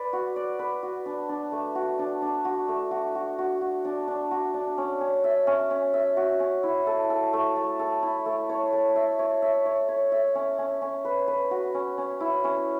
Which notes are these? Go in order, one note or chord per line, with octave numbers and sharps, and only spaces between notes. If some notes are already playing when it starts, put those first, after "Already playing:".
Already playing: B4 D5
F#4
D5
B4
F#4
D4
D4
A3
F#4
D4
D4
F#4
A3
F#4
F#4
F#4
F#4
D4
D4
F#4
D4
C#4
C#4
E5
C#4
C#4
E5
F#4
C#4
E4
A4
A4
A3
A3
A4
E4
A3
C#5
A4
E5
C#5
E5
C#5
C#5
E5
C#4
C#4
C#4
B4
B4
F#4
C#4
C#4
E4
C#4